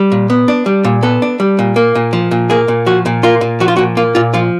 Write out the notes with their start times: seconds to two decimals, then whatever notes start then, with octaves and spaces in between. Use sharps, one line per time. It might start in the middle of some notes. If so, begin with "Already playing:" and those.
Already playing: G3
0.12 A#2
0.30 B3
0.48 D4
0.66 G3
0.84 A#2
1.03 B3 A4
1.22 D4
1.40 G3
1.59 A#2
1.76 A#3
1.95 A#2
2.13 F3
2.31 A#2
2.50 A#3 G#4
2.68 A#2
2.86 F3 F#4
3.06 A#2
3.23 A#3 F4
3.41 A#2
3.60 F3 F#4
3.68 F4
3.77 A#2 F#4
3.97 A#3 F4
4.15 A#2 F4
4.34 F3 F4